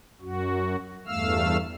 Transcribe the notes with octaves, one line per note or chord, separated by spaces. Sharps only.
F#2 F#4
E2 G2 A3 F5 E6 F6